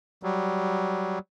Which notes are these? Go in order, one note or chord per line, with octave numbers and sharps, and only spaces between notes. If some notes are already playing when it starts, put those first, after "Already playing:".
F#3 G3